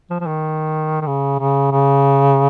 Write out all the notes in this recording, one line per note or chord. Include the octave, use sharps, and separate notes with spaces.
F3
F3
D#3
D#3
C#3
C#3
C#3